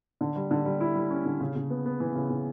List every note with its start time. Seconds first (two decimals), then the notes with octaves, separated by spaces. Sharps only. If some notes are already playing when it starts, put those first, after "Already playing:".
0.21 D3
0.36 G3
0.51 D3
0.65 G3
0.81 E4
0.95 G3
1.11 C#4
1.26 D3
1.40 C#3
1.56 C#3
1.70 B3
1.86 B3
2.00 E3
2.15 C#3
2.30 C#3